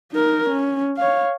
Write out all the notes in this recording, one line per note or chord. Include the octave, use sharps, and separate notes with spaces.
D#4 A#4
C#4
C#5 F5